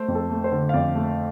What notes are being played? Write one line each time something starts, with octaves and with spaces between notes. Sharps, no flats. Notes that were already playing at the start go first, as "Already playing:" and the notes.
Already playing: A3 C5
F2
A4
A3
C5
D3
F5
F2 D5
A3